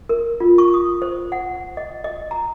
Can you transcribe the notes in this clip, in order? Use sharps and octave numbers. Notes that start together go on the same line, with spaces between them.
A#4
F4
C#6
D#6
C5
F#5
D#5
D#5
A#5